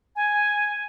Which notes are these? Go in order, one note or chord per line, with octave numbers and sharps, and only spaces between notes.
G#5